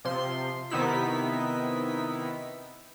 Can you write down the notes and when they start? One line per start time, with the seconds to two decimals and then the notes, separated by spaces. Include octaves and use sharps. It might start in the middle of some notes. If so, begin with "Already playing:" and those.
0.05 C3 F3 C6
0.70 C3 D#3 B3 D#4 E4 B6